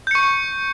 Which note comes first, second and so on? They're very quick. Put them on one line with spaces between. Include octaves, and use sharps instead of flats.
G6 C#7 C#6